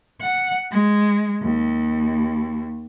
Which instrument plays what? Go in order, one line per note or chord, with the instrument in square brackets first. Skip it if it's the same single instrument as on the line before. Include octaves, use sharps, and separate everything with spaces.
[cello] F#5
G#3
D#2